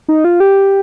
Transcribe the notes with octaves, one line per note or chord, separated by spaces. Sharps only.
D#4
F4
G4